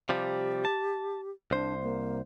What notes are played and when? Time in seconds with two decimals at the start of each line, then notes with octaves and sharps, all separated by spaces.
0.09 C3 F3 G3 G4
0.65 A5
1.51 C2 D4 C5
1.83 A#3